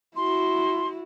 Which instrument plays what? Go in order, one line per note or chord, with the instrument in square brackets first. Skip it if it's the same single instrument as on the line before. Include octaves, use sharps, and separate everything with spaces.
[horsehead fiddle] E4 F#4 [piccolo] C6